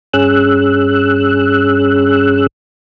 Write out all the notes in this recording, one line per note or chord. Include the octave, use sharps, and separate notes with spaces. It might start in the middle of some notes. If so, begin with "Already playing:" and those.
G2 C#4 G#4 E6 F#6